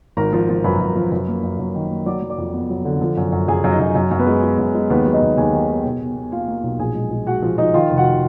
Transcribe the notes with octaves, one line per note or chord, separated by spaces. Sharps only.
G#1 A#4 A#5
F3
F3
F#2 B4 B5
F#2
F3
F#2
A#3
F#2
F#2
D#3
A#3
F#3 D5 D6
F#3
D5 D6
F2
B3
F#3
D3
F3
F#2
F#2
F#2 G#4 G#5
F#2
D#4 D#5
F#2
F#2
F#2
B3 B4
G#3
G#3
F#2
G#3
D#2 B3 B4
F#3
D#4 D#5
D#2
D#2 G#4 G#5
D#3
B3
B2
B2
B2
A#3 F4 F5
A#3
B1
A#1 G#4 G#5
G#3
G#3
G#3 F#4 F#5
F3
F3 D#4 D#5
D#3 F4 F5
F1
F#4 F#5